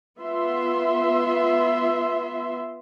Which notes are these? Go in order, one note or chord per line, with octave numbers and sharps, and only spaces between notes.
B3 F4 E5 C6